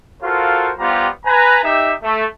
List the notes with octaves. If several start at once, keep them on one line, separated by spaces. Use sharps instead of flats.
F4 F#4 A4 A#4 C5 F5
G3 B3 F4 G4 C5 A#5
B4 G#5 A#5
D#4 G4 E5
A3